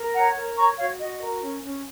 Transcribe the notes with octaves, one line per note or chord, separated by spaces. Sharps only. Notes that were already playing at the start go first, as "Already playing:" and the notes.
Already playing: A#4
C#5 F#5 A#5
A#4
C#5 A#5 C#6
F#4 C#5 F5
F#4 D#5
A#4
C#4
C#4